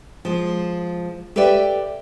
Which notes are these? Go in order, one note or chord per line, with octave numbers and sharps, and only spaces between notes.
F3 G#3
G4 A4 B4 D5 E5 G5